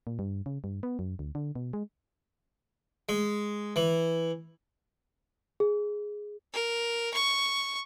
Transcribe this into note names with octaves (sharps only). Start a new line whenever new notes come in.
A#2
G2
C#3
G2
B3
F#2
D2
D3
B2
G#3
G#3
E3
G#4
A#4
C#6